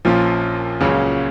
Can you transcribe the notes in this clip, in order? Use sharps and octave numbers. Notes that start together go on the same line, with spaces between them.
A#1 A#2 F3 A#3 C#4 F4
C#2 A#2 C#3 F#3 C#4